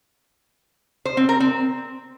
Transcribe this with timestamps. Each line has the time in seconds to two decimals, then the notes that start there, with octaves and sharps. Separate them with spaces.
1.05 C5
1.17 C4
1.29 A#4
1.40 C4